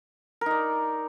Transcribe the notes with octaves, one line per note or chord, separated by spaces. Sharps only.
D#4 A#4 D5